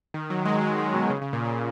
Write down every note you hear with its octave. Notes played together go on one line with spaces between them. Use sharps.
D#3
F#3
G#3
F#3
D#3
B2
C#3
C#3
A#2
C#3